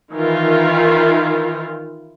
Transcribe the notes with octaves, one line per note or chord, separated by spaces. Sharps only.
D#3 E3 E4 F4